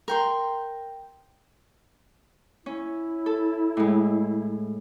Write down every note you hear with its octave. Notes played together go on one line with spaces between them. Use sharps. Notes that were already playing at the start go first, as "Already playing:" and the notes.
A#4 G5 C6
C#4 E4
A4
A2 G#3